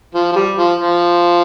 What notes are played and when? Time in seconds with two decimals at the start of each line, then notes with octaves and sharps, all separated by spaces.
0.14 F3
0.32 F3
0.36 G3
0.57 F3
0.78 F3